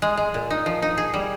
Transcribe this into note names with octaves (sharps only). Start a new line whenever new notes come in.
G#3
G#3
A#2
D#4
F3
D#4
G#4
G3